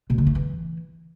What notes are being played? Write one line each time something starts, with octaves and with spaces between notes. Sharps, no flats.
B2
D3
A3
E3